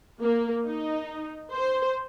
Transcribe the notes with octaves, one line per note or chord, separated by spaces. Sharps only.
A#3
D#4
C5